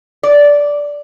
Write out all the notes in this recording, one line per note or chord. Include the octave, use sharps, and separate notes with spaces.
D5